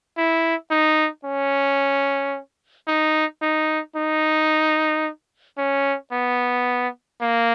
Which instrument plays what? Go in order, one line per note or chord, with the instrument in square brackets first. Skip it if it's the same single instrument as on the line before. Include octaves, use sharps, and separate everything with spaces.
[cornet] E4
D#4
C#4
D#4
D#4
D#4
C#4
B3
A#3